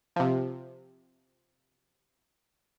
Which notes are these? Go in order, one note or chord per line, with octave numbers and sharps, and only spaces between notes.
C3 F3